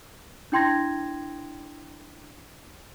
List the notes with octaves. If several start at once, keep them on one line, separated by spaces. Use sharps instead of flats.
D4 E4 G5 C6 G#6 A#6